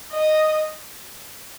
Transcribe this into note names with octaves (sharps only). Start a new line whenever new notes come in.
D#5